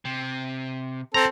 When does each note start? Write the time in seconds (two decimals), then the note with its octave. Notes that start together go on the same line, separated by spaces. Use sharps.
0.05 C3
1.14 C4 A4 A#5